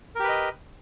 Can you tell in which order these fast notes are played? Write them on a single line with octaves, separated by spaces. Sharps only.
A#4 G4 B4 D#5